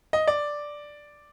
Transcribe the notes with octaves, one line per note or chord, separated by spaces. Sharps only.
D#5
D5